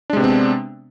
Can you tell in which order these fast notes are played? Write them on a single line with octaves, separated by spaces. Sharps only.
D4 G#3 C3 B3 C4